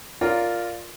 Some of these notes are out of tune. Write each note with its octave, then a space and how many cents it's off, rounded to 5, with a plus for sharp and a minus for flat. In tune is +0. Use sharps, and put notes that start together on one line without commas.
F4 +0 A#4 -5 D5 +0